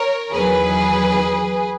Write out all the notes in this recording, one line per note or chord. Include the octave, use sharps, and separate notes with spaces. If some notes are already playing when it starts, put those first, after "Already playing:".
Already playing: A#4 C#5
E2 D#3 F#3 G#4 B4